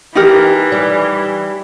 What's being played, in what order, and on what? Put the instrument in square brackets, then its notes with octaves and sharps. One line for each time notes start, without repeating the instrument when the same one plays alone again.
[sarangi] E3 [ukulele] D#4 G4 A#4
[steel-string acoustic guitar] G3